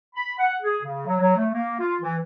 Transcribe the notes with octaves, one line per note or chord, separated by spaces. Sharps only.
B5
F#5
G#4
C#3
F#3
F#3
A3
A#3
F4
E3